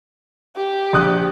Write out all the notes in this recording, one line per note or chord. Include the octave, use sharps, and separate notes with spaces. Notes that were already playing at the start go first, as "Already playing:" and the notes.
G4
A#1 D#6 F#6